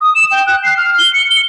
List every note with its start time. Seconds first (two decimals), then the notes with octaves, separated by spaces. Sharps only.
0.01 D#6
0.15 E7
0.31 G5
0.47 F#6
0.63 C7
0.77 F6
0.98 G7
1.13 C#7
1.30 G7